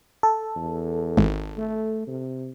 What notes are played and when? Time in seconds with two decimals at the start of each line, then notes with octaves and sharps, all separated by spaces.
0.23 A4
0.56 E2
1.17 G#1
1.57 A3
2.07 C3